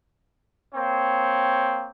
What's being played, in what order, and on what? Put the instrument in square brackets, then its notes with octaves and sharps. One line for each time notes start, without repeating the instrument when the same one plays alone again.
[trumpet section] A#3 C4 C#5 G5